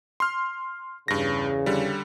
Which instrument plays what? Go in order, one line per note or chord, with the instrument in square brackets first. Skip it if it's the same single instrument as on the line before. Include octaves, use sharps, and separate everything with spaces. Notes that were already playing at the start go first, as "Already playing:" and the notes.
[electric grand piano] C6 F6
[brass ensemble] E2 C#3 [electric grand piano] G2 A#6
[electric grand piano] D3 G3